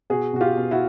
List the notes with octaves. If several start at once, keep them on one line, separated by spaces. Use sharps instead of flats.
B2 F#4 G#4
B2 F#4
F4 G4
B2
E4 F#4